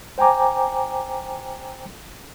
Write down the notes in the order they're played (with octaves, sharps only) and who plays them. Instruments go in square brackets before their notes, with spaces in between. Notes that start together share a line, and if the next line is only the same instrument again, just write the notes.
[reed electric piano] C5 G5 G#5 A#5 D6